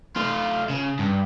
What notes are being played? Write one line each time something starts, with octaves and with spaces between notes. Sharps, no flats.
A3 F4
C#3
G2